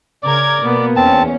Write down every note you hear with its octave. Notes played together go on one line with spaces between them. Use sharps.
C#3 A#4 D5 G#6
B2 A#3 B3
E2 C4 C#4 A5